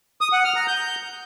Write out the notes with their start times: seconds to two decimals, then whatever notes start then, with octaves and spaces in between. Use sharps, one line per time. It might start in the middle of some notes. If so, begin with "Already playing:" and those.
0.21 D#6
0.33 F#5
0.44 F6
0.56 A#5
0.67 G6